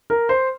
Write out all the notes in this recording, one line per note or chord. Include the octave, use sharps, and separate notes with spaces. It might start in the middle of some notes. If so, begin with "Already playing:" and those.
A#4
C5